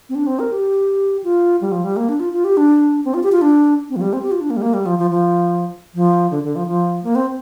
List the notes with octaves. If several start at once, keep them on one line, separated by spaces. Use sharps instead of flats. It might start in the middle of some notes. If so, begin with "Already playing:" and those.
C4
D4
C4
A#4
G4
F4
G3
F3
G3
A#3
D4
F4
F4
G4
D4
C4
F4
G4
F4
D4
C4
F3
G3
C4
G4
F4
D4
A#3
G3
A#3
G3
F3
F3
F3
F3
D3
D3
F3
F3
A#3
C4